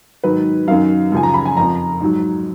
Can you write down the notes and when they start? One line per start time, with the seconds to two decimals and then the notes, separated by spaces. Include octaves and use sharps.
0.23 G#2 D#3 F#3 B4
0.67 F#2 D#3 F#3 F5
1.12 F#2 C#3 F3 G#5
1.23 A#5
1.34 B5
1.46 G#5
1.57 F2 F3 A#5
2.01 G#2 F#3